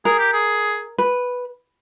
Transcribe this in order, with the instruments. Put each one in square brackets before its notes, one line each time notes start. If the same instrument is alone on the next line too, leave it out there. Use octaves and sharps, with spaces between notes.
[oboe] G#4 [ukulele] A#4
[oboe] G4
G#4
[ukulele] B4